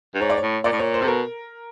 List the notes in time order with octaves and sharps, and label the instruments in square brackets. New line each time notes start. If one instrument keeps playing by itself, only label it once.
[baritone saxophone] G2
[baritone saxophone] G#2 [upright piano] C#5
[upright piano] D5
C#5
[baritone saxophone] A2
[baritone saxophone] A#2 [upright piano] D5
[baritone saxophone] A2
[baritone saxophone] A#2 [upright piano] C#5
[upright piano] C5
[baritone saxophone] C3 [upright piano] A4
[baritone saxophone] B2 [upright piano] A#4